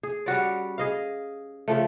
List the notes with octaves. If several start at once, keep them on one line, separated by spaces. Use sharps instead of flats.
G#4
G3 C#4 F#4 D5
G#4 D#5 F5
C#3 F3 A3